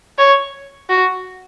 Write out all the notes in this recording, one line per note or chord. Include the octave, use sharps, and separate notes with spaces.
C#5
F#4